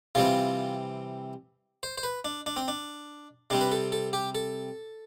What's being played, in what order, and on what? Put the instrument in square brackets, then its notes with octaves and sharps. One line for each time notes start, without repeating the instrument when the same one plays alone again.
[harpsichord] C3 E3 G3 C4 F4
C5
C5
B4
D4
D4
C4
D4
C3 G3 C4 D4
B4
A4
A4
G4
A4